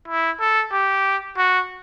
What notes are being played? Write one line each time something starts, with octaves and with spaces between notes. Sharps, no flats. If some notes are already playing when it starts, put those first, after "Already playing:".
E4
A4
G4
F#4